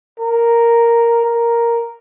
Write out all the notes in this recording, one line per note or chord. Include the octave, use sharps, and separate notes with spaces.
A#4
A#4